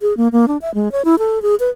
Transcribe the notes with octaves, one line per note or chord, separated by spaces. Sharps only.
G#4
A#3
A#3
D4
E5
G#3
C#5
E4
A4
G#4
B4